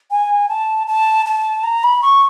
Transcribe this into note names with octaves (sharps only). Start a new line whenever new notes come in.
G#5
A5
A5
A5
A#5
B5
C#6